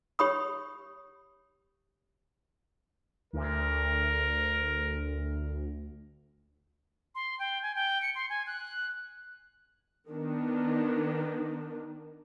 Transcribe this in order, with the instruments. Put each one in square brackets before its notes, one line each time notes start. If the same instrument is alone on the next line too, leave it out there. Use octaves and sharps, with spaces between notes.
[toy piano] G4 C#5 B5 D#6
[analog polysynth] D2 [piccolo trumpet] A#4
[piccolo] C6
G5
G#5
G5
C#7
C6
G#5
F#6
[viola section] D#3 B3 D4